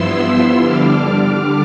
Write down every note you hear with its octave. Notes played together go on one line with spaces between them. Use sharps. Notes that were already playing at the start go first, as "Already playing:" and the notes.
Already playing: G2 F3 B3 E4 C6 E6
C6 E6
D3 G3 D4 D6 F6